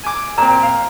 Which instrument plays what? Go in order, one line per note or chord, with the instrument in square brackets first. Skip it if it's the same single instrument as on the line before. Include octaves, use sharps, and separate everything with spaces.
[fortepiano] G#5 D6
[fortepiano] A#2 C4 [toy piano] A#5
[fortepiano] F5